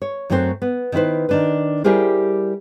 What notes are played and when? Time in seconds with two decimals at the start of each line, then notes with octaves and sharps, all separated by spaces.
0.02 C#5
0.30 F#2 F#3 A3 C4 G4 C5
0.62 B3
0.92 D#3 E4 F4 B4 C5
1.29 D#3 D4 B4
1.84 G3 E4 G4 G#4 A#4 C5